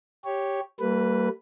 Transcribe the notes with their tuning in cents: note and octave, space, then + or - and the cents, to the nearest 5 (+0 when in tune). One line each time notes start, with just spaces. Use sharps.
G4 +0 C#5 +0
G3 -25 A#3 -40 B4 +0